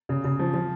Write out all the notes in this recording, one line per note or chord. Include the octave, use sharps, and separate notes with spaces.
C#3
C#3
F3
F3